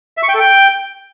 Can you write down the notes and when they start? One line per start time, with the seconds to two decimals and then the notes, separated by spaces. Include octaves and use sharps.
0.17 E5
0.23 C#6
0.29 G5
0.34 A4
0.40 G5